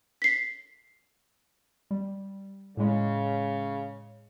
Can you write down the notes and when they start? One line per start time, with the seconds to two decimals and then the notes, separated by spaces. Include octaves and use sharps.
0.22 B6 C7
1.91 G3
2.77 A2 C#3 G#3